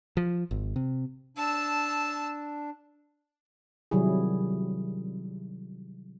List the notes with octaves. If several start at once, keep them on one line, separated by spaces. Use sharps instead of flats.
F3
G#1
C3
D4 A5 E6
C3 D#3 F#3 G3 E4 G#4